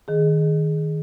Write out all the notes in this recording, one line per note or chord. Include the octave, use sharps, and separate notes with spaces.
D#3 G#4